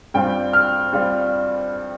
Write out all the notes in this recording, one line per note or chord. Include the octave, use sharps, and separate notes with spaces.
G2 G3 C4 F4 G5
F6
G3 C4 F4